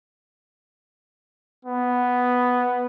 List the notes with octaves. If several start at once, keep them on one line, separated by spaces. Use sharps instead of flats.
B3